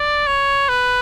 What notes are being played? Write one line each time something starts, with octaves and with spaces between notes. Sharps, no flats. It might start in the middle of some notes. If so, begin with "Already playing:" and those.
Already playing: D5
C#5
B4